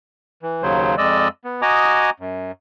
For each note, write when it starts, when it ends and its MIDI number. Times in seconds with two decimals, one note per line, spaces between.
0.43 0.63 52
0.63 0.95 39
0.63 0.95 49
0.63 0.95 54
0.63 0.95 72
0.98 1.28 41
0.98 1.28 56
0.98 1.28 74
0.98 1.28 75
0.98 1.28 88
1.45 1.61 59
1.62 2.10 66
1.62 2.10 75
1.62 2.10 80
1.62 2.10 82
1.62 2.10 86
1.62 2.10 87
2.20 2.52 42